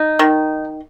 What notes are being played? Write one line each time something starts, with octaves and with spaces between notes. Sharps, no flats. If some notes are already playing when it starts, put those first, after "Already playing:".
Already playing: D#4
D#3